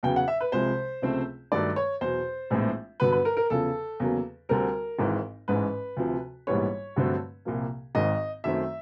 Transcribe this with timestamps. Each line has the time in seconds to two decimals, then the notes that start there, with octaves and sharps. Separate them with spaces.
0.03 E2 C#3 F#3 B3 G5
0.16 F#5
0.28 E5
0.41 B4
0.52 C2 C3 F3 G#3 C5
1.02 C#2 C3 F3 A3 C4
1.52 G2 D#3 F#3 A3 D5
1.76 C#5
2.01 E2 B2 F#3 C5
2.50 A#1 A2 E3 G#3 C4
3.00 G2 D3 F#3 B3 B4
3.12 B4
3.25 A#4
3.37 A#4
3.50 E2 C#3 F3 A4
4.00 E2 C#3 F#3 A#3
4.49 D2 D3 G3 C4 A#4
4.99 G#1 G#2 E3
5.48 A1 G#2 E3 G#3 B4
5.97 D2 C3 F3
6.47 A#1 G#2 E3 G3 B3 C#5
6.96 G2 D3 F#3 A3 C4
7.45 C2 A#2 F3 A#3
7.95 G#1 G#2 D#3 D#5
8.44 F#2 D#3 F#3 A3 C4 E5